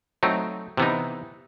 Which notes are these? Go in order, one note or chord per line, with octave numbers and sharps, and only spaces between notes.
F#3 A3 C4 D#4
C3 E3 B3 D#4